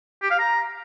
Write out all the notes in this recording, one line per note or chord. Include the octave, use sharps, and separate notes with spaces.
G4
F5
A#5